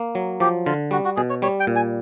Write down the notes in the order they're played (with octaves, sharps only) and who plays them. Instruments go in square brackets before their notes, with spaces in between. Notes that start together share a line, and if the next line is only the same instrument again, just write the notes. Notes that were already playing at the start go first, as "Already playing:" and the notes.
Already playing: [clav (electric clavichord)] A#3
F#3
[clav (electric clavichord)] F3 [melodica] G4
[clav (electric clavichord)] D3 [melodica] F4
[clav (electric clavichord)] G3 [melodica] F#4
[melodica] F#4
[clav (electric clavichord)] B2 [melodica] G#4
[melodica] C#5
[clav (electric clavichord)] G3 [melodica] C#5
[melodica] G5
[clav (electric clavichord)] A#2
[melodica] G#5